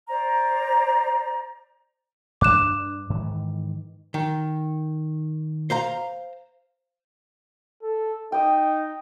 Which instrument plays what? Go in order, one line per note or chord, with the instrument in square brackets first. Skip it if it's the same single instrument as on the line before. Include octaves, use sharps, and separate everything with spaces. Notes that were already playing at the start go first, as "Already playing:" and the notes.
[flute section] C5 D5 A#5
[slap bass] G2 D4 [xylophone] D6 F#6 E7
[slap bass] G#2 D#3 E3
[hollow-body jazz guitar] D#3
C5 F5 A#5
[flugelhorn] A4
[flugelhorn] D#4 [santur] G5 D#6